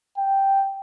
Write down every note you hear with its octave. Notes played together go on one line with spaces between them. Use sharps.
G5